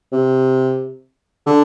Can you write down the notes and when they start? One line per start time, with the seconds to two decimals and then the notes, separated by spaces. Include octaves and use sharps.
0.12 C3
1.47 D3